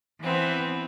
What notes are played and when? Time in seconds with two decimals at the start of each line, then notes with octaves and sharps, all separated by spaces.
0.22 E3 B3 C4